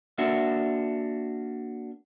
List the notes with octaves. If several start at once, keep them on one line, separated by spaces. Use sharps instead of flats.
A#3 D4 F#4 E5